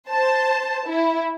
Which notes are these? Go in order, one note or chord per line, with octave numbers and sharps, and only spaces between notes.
C5 A5
E4